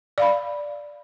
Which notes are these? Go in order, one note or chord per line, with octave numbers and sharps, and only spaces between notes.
D5 F5 B5